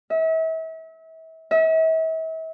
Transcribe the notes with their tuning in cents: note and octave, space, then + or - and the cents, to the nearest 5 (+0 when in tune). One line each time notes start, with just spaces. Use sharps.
E5 -35
E5 -40